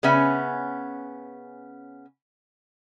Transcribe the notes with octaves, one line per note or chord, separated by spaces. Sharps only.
C#3 B3 C#4 E5 G#5